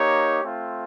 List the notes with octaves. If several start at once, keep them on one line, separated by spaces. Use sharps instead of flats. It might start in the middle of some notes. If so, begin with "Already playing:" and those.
Already playing: A#3 D#4 G4 C#5
A3 C4 F4